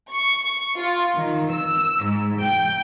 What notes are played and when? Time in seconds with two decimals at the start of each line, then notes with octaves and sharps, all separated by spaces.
0.12 C#6
0.79 F4
1.14 D#3
1.53 E6
2.03 G#2
2.42 G5